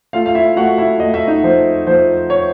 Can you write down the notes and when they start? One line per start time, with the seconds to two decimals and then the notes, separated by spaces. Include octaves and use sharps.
0.13 A3 F4 F5
0.26 F5
0.35 E4 E5
0.56 A3 F#4 F#5
0.78 E4 E5
1.00 A3 D#5
1.14 E5
1.27 D#4 D#5
1.43 F3 C5
1.87 F3 C5
2.30 C#5